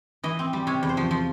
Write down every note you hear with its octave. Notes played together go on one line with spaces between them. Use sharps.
E3 D#5
C4
G3
C3 C#5
E2
C5
F3
F3